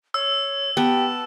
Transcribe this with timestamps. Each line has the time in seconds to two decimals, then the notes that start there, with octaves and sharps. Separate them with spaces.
0.14 C#5 E6
0.77 B3 G4 A5